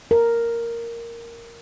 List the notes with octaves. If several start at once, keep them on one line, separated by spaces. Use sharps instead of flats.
A#4